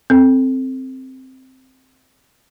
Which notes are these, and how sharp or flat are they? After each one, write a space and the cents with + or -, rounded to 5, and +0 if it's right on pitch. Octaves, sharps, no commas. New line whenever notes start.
C4 +0 A4 +0